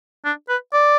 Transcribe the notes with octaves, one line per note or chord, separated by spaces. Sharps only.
D4
B4
D5